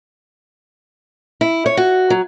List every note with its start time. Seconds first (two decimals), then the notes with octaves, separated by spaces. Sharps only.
1.41 E4
1.66 C#5
1.77 F#4
2.10 F#3